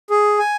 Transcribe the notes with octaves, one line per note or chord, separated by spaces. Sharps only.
G#4
G#5